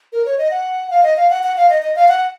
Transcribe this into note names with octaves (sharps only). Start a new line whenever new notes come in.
A#4
C#5
D#5
F#5
F5
D#5
F5
F#5
F#5
F5
D#5
D#5
F5
F#5